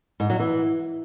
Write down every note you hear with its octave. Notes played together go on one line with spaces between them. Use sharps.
G#2
F#3
E3